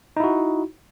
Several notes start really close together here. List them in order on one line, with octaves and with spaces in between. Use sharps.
D#4 E4 F#4